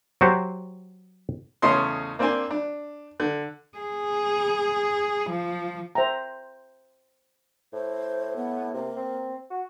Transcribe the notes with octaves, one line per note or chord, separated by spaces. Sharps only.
F#3 F#4 G4 C5
E2 A2 C#3 C#4 D#5 C6
A#3 C4 D4 C5 G#5
D4
D3
G#4
F3
C5 E5 G5 A#5
A2 C5
B3
C3 A#3
C4
F#4